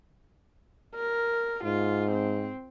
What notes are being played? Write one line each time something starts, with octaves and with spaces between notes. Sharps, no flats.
A#4
G#2 F4
C4